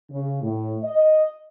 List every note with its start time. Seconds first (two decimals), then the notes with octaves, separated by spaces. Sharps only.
0.10 C#3
0.43 A2
0.84 D#5